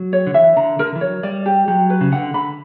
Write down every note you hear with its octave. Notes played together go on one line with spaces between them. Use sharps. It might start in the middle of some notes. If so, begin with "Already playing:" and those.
Already playing: F#3
C#5
D3
E3 E5
D3 A#5
D3 A#4
E3
F#3 C#5
G3 D5
G4
F#3 G4
B4
C#3
D3 F#5
D3 B5